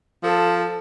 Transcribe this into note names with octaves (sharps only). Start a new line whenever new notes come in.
F3 A4